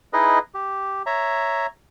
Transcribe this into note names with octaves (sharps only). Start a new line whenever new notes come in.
D#4 E4 G#4 B4 D#5
G4
C#5 E5 A#5